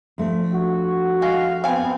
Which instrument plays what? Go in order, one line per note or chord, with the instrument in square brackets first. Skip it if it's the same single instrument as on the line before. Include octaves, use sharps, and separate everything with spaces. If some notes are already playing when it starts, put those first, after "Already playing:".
[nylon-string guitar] F2 A3 D4
[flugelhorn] F#4
[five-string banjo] G#3 [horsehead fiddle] F5
[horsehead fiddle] B3 C4 [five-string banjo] F5 G#5